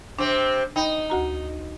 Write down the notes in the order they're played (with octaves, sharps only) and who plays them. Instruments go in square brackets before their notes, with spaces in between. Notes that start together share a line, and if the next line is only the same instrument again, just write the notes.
[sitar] C3 C4 [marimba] D4
[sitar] D#4 [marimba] G5 B5
[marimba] D2 F#4 A#5